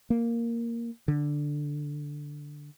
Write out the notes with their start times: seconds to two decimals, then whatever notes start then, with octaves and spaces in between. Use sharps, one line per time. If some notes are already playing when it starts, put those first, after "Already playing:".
0.10 A#3
1.08 D3